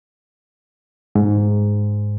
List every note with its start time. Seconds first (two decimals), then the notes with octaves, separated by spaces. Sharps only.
1.15 G#2